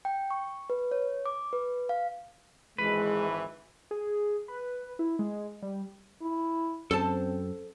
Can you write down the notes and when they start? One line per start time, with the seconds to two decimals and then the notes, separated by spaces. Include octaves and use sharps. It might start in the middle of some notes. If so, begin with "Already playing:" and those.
0.05 G5
0.31 C#6
0.70 B4
0.91 C#5
1.26 D6
1.53 B4
1.89 F5
2.78 G#1 E3 G#3 B4
3.91 G#4
4.48 B4
4.99 E4
5.19 G#3
5.62 G3
6.22 E4
6.91 F#2 C4 A4 C5 A5